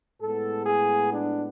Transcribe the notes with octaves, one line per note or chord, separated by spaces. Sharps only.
A2 G#3 B3 A4
G#4
D4